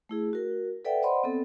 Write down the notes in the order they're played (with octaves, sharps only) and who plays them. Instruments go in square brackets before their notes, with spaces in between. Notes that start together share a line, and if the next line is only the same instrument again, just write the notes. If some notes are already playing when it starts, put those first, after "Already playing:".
[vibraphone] A3 E4 G#4
F#4 A#4
A4 B4 D5 E5 F#5 G5
C5 D5 D#5 F#5 B5 C6
B3 C4 A4